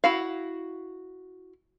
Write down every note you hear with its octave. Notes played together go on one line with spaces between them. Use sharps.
E4 F#4 F5